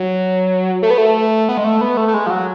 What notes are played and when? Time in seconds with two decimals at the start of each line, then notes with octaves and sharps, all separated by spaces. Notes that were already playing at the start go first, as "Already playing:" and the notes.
Already playing: F#3
0.83 A3
0.91 B3
0.98 A3
1.49 B3
1.58 G#3
1.64 A3
1.81 B3
1.97 A3
2.08 A3
2.14 G#3
2.27 F3
2.30 F#3